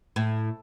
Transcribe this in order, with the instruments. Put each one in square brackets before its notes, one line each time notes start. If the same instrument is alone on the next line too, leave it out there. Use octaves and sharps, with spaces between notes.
[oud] A2